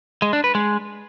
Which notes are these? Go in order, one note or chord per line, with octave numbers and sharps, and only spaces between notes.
G#3
D4
B4
G#3